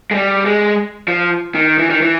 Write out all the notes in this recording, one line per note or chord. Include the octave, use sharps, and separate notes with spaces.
G#3
G3
G#3
F3
D#3
E3
D#3
E3